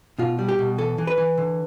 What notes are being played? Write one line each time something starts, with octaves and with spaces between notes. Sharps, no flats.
B2 F4
G3
G4
B2
E3 A4
E3
B4
E3
D3